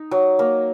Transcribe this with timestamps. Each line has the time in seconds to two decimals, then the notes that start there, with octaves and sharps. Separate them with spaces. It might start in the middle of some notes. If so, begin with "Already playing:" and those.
Already playing: D#4
0.11 F#3
0.39 A#3